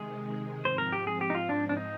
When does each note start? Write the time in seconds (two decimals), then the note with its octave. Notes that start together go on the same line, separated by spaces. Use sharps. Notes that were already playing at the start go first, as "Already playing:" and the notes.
Already playing: C3 D#3 G#3 G#4
0.64 G#2 F3 C4 C5
0.78 A#4
0.93 G4
1.07 G#4
1.21 G4
1.30 D#4
1.35 F4
1.49 D4
1.69 D4
1.77 D#4